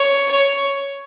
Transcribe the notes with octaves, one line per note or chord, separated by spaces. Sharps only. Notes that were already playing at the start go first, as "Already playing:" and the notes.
Already playing: C#5
C#5